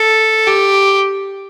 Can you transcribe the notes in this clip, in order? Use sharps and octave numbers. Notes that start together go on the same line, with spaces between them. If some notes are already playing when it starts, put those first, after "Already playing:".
Already playing: A4
G4